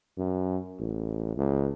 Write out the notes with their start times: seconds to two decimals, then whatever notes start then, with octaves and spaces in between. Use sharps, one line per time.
0.18 F#2
0.80 A1
1.36 C#2